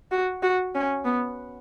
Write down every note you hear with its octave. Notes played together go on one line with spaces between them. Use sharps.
F#4
F#4
C#4
B3